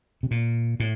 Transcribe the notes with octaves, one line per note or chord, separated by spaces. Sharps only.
C3
A#2
A2